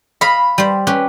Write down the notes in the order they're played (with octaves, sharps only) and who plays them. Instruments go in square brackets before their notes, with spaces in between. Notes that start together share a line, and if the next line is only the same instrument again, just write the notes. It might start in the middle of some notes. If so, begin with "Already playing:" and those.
[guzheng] D#5 F5 [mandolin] B5
[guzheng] G3 C5
C#4 G4 B4